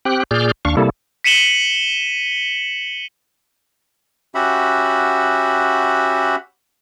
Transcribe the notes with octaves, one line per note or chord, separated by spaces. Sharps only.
C4 G4 G5 F#6
A#2 G#4 D5 F6 G6
D#2 D4 F5 C#6
C3 G3 A#3 E4 A4
B6 C#7 D#7 E7 F#7 G7
C#4 F#4 G4 E5 F#5 B5